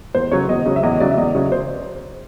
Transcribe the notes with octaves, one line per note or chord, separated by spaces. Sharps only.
E2 C5
C#3 F#3 C#5
E2 D#5
C#3 F#3
E5
E2 D#5
C#3 F#3 D5
E5
E2 D#5
C#3 F#3 C#5
C5